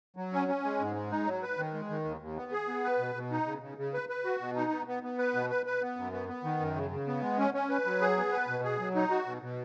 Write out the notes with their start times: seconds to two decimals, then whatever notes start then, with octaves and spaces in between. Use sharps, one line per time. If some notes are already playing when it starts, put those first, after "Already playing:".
0.16 F#3
0.33 C#4
0.48 C#4
0.64 G#3
0.80 G#2
0.95 G#3
1.11 D#4
1.26 F#3
1.43 B4
1.58 D#3
1.74 G#3
1.90 D#3
2.05 D#2
2.21 D#2
2.37 B3
2.52 G#4
2.68 B3
2.84 B4
2.99 B2
3.15 B2
3.31 D#4
3.46 C#3
3.62 C#3
3.78 C#3
3.94 B4
4.09 B4
4.24 F#4
4.40 B2
4.56 D#4
4.71 B3
4.87 B3
5.03 B3
5.19 B4
5.35 B2
5.50 B4
5.66 B4
5.82 B3
5.97 F#2
6.12 B3
6.28 B3
6.44 D#3
6.60 F#2
6.76 C#3
6.91 C#3
7.07 B3
7.22 G#3
7.39 C#4
7.54 C#4
7.70 B4
7.86 F#3
8.01 G#4
8.17 B3
8.32 B4
8.48 B2
8.64 G#4
8.80 F#3
8.95 D#4
9.10 F#4
9.27 B2
9.42 B2